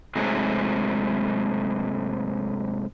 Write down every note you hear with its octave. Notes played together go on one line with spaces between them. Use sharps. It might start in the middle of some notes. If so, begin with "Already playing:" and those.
G#2 C3 F#3 G#3 A3